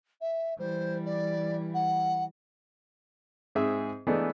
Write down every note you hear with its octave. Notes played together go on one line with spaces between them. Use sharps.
E5
E3 G3 C5
D5
F#5
G#2 C4 G#4 E5
E3 G#3 A3 B3 D4 D#4